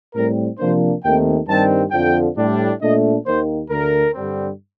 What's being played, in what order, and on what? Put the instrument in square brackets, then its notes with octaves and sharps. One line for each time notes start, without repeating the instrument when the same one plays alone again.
[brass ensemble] A2 G3 C4 A#4
C3 F3 A#3 D4 C5
D#2 D#3 A3 C4 G5
G2 D#3 G3 C4 A5
F2 D3 F3 G5
A2 G3 D4
A#2 A3 D4 D#5
D#2 D#3 A#3 C5
D2 D3 A3 A#4
G2 D3 G3 C4